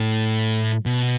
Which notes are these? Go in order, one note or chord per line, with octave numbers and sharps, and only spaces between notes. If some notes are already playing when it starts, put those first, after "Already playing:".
Already playing: A2
B2